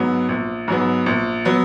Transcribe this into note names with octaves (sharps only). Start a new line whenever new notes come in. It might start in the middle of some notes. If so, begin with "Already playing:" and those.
Already playing: G#2 F#3 B3
A#1
G#2 F#3 B3
A#1
F#3 B3